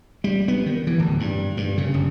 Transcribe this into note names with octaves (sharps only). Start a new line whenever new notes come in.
G3
B3
D#3
E3
D1
G2
G2
C#3
F#1